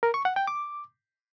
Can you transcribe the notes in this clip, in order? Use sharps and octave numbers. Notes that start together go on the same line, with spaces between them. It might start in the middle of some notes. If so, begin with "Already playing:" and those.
A#4
C#6
F#5
G5
D6